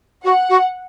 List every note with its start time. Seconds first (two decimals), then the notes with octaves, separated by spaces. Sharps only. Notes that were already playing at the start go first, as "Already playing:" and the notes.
0.24 F#4 F#5
0.49 F#4